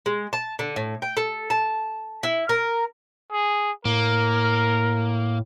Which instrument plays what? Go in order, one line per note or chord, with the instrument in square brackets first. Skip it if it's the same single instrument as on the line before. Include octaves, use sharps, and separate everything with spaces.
[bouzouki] G#3
A5
D3
A2
G5
A4
A5
E4
A#4
[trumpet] G#4
[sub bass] A2 [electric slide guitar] A#3 [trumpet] A#4